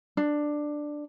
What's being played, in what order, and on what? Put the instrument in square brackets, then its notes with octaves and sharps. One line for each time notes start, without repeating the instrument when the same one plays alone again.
[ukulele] D4